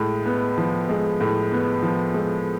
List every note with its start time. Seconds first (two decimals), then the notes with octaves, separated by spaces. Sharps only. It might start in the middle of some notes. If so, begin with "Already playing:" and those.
Already playing: A2 G#3
0.26 B3
0.58 F3
0.89 G#3
1.20 A2
1.52 B3
1.82 F3
2.14 G#3